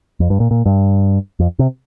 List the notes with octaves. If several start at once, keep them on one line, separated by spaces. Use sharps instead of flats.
F2
G2
A#2
A#2
G2
F2
C3